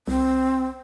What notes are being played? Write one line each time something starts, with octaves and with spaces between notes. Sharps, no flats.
C2 C4